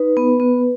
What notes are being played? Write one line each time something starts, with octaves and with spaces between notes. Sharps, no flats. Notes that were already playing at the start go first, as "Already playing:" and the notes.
Already playing: D#4 B4
B3
B3